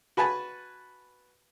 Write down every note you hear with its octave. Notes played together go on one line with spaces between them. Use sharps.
F#4 B4 G#5 A5 B5